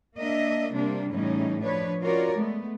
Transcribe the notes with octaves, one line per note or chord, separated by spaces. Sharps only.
A#3 D4 D#5 E5
C3 G3 A#3 D4
A2 C#3 E3 G3 C#4 D#4
F3 D4 B4 C#5
C#4 F4 F#4 A#4 C#5 D5
G#3 A3 B3